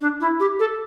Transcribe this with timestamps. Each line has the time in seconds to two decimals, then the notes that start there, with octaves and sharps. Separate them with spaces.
0.01 D4
0.20 E4
0.40 G4
0.59 A4